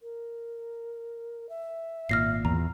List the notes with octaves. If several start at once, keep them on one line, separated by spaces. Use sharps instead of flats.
A#4
E5
G#1 A#2 F6 A#6 C7
E2 F4 A#5